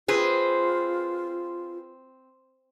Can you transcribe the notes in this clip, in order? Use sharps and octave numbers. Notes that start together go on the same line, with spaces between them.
C4 F4 G#4 B4